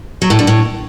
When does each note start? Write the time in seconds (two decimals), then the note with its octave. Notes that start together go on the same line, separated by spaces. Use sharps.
0.22 F#3
0.30 A2
0.39 D3
0.47 A2